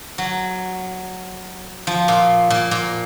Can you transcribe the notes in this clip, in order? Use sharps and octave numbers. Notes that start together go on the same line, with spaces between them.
F#3
F3
A#2
A#2
A#2